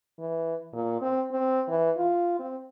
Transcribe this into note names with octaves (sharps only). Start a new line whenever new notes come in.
E3
A#2
C4
C4
E3
F4
C4